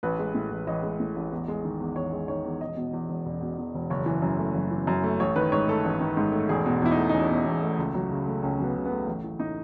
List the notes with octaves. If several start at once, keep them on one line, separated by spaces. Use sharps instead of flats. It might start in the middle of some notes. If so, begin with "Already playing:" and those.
A1 B4
G#3
A2
A1
A1 D#5
G#3
A2
A1
E2
G#3
D#3
E2
E2 C#5
G#3
D#3 C#5
E2
E1 D#5
B2
E2
E1
E1
B2
E2
E1
F#1 C#5
E3
F#2
A3
F#1
E3
F#2
A3
A1 C#5
D#3 B4
G#2 C#5
A3 A4
A1
D#3
G#2
A3
E1 G#4
B2
E2 E4
D#4
A3
D#4
E1 C#4
B2
E2
A3
C#2
F#3
C#3
A3
C#2 C#4
F#3 B3
C#3
B3
A3
A1
E3
A2 D#4